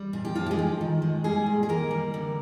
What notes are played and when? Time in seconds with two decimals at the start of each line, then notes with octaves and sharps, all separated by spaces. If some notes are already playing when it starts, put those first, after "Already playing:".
Already playing: G3
0.13 A#2 G#4
0.25 G4
0.35 D3 F3 F4
0.46 G4
0.51 G#3 G#4
0.59 F3
0.81 D#3
1.02 G#3
1.24 G3 G#3 G#4
1.46 A#2
1.63 G#4
1.69 D#3 A#3 A#4
1.91 G3
2.14 D3